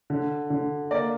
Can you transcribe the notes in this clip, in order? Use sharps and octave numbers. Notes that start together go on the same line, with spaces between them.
D3
D3
A#3 D5